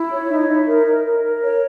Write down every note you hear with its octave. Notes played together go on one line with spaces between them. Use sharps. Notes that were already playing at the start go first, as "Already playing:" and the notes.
Already playing: E4
C#5
D#4 E5
D#5
D#4 E5
A#4
A#4
A#4
A#4
C#5